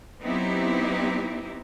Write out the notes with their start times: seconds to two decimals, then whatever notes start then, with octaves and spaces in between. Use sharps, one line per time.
0.23 F#3 B3 C4 D#4 E4 G4